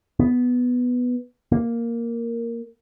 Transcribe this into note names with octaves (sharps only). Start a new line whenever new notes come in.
B3
A#3